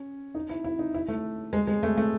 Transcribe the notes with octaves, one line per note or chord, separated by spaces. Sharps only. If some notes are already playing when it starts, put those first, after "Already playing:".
Already playing: C#4
D#4
E4
E4
D#4
E4
A3
G#3
G#3
A3
A3